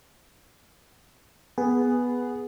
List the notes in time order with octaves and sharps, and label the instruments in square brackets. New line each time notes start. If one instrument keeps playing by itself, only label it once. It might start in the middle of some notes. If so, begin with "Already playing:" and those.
[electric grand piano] B3 [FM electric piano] G#4